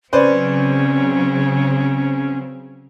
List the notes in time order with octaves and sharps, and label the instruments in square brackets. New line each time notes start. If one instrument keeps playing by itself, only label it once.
[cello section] C#3 F#3 C4 [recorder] C#4 [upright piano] B4 C5 D5